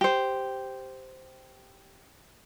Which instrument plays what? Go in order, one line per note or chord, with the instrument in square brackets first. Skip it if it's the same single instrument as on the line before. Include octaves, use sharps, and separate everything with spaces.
[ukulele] G4 C5